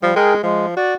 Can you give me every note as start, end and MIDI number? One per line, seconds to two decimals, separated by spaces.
0.03 0.11 53
0.03 0.13 55
0.16 0.41 56
0.16 0.34 68
0.16 0.34 70
0.16 0.34 79
0.43 0.76 53
0.43 0.66 56
0.77 0.94 66
0.77 0.94 74